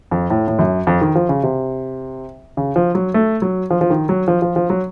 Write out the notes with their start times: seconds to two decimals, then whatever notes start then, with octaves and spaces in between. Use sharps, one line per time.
0.11 F2
0.30 A2
0.48 A2
0.59 F#2
0.87 F2
1.01 D#3
1.15 F3
1.29 C#3
1.43 C3
2.57 C#3
2.76 F3
2.95 F#3
3.14 A3
3.42 F#3
3.70 F3
3.81 F3
3.90 D#3
4.09 F#3
4.28 F3
4.42 F3
4.56 F3
4.70 F#3